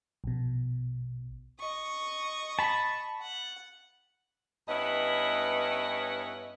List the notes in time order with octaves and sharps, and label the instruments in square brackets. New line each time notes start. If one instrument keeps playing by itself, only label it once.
[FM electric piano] A#1 B2
[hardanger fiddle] D#5 C#6
[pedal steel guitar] A5 B5
[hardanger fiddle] F#5
[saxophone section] G2 B3 C#4 E4 B4 D#5